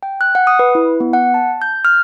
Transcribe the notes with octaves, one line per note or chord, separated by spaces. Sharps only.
G5
F#6
F#5
D#6
B4
E4
B3
F#5
A5
G6
F6